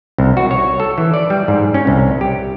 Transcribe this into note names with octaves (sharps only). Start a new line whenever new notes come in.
C2
F#4
C#5
A4
E3
D5
G3
G#2
C#4
C2
G4